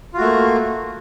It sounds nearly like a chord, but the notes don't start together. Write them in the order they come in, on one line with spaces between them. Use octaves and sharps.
F4 F#4 A3 A#3